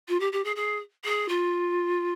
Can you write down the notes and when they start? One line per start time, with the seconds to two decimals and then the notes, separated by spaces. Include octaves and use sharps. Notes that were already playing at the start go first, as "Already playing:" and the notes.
0.08 F4
0.20 G4
0.32 G4
0.44 G#4
0.56 G#4
1.05 G#4
1.29 F4